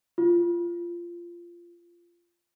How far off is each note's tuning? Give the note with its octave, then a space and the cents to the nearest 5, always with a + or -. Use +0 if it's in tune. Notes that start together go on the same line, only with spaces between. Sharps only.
F4 -15